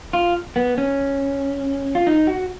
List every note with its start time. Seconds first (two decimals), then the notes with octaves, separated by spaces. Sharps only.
0.13 F4
0.56 B3
0.78 C#4
1.95 F4
2.07 D#4
2.27 F#4